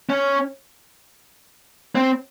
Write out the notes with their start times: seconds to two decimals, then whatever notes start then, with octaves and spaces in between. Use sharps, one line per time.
0.10 C#4
1.95 C4